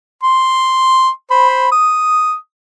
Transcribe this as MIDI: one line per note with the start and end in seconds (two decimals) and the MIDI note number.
0.23 1.09 84
1.31 1.68 72
1.31 1.68 83
1.72 2.34 87